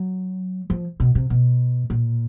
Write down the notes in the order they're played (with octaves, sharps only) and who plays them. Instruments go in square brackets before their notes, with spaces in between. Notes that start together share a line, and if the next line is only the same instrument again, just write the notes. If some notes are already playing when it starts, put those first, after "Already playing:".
Already playing: [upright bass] F#3
F3
B2
C3
B2
A#2